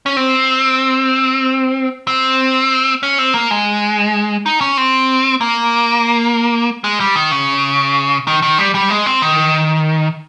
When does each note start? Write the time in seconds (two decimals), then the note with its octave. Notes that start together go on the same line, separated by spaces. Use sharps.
0.06 C#4
0.17 C4
2.07 C4
3.03 C#4
3.19 C4
3.34 A#3
3.51 G#3
4.46 D#4
4.61 C#4
4.77 C4
5.41 A#3
6.84 G#3
7.00 G3
7.16 D#3
7.32 C#3
8.27 D#3
8.42 D#3
8.59 G3
8.75 G3
8.90 G#3
9.06 C4
9.22 D#3